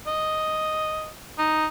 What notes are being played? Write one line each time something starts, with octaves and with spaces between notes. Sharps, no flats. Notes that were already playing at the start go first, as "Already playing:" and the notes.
D#5
D#4